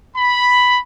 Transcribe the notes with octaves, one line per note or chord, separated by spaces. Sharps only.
B5